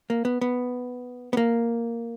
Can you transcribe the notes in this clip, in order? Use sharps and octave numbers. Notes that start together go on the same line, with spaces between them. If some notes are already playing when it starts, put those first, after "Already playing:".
A#3
B3
B3
B3
A#3